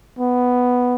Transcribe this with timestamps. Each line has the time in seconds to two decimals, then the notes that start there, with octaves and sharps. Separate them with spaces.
0.19 B3